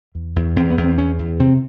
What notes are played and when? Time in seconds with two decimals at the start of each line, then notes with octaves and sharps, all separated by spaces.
0.15 E2
0.36 E2
0.56 E2 C4
0.70 B3
0.77 E2
0.84 C4
0.98 E2 C#4
1.19 E2
1.40 C3 C4